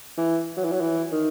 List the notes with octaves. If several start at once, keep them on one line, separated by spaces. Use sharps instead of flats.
E3
F#3
E3
F#3
E3
D#3